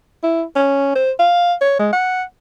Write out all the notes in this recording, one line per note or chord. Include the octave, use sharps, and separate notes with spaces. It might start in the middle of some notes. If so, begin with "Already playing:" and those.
E4
C#4
C5
F5
C#5
G#3
F#5